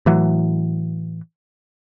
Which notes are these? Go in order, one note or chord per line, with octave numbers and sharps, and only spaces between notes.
A2 E3 F#3